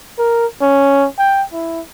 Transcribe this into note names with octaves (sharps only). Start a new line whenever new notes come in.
A#4
C#4
G5
E4